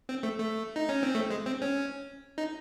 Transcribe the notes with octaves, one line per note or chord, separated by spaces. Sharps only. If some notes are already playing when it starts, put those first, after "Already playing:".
C4
A3
A3
D#4
C#4
C4
A3
G#3
C4
C#4
D#4